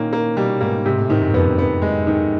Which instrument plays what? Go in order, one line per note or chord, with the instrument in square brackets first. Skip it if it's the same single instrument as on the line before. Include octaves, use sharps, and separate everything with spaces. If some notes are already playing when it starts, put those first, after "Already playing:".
Already playing: [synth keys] A#2 [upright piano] D#3 A#3 C#4
[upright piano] A#3
[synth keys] B2 [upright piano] G3
[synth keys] G#2 [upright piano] A#3
[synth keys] G#2 [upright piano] C3
[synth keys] A2
[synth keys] G#2 [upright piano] D#3
[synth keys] F#2
[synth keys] F2 [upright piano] B3
[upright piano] B3
G#3
D#3